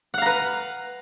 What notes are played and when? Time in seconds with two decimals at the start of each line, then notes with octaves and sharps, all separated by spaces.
0.14 F#5
0.18 F5
0.22 A#5
0.26 B4